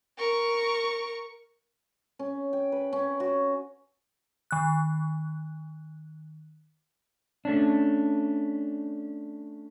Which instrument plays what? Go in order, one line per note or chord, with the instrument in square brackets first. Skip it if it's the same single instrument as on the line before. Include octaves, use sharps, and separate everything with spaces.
[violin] A#4 C#6
[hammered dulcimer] C#4
G5
B4
C#4
F#4
[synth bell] D#3 F#6
[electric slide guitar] A3 C#4 D4